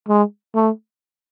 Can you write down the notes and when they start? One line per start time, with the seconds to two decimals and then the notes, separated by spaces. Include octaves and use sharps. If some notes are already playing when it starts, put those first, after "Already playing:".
0.08 G#3
0.55 A3